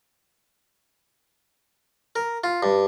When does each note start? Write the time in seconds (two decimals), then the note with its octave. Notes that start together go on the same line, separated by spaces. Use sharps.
2.16 A#4
2.44 F4
2.63 G2